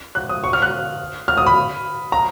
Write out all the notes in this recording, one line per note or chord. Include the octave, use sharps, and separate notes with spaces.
F#6
D#6
C#6
F6
F#6
F6
D#6
B5
A#5